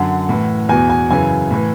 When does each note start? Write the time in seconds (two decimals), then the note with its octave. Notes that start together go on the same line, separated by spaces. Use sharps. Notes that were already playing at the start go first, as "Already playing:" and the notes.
Already playing: F#2 D3 F#5
0.29 A2 E3
0.69 E2 B2 G#5
0.90 G#5
1.10 F#2 C#3 E3 G#5
1.51 A2 E3